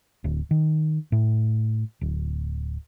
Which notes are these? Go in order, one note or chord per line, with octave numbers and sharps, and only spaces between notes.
D1
D#3
A2
D1